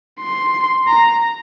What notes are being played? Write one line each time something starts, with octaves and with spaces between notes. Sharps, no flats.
C6
A#5